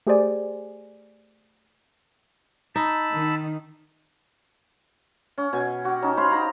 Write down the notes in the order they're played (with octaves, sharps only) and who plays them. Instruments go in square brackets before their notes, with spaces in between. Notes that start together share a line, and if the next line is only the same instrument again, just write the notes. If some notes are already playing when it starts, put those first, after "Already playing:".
[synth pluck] A3 G4 G#4 C5 D5 G#5
[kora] D#4 [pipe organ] A5 B5 E6
[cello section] D#3
[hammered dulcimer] C#4
B2 G#5
F#4 G4
C#4 D#4 A5
C5 C#5 F5 B5
D#4 G4 A#5